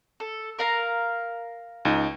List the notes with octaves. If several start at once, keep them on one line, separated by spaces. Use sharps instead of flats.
A4
A#4 F5 A#5
C#2 D#4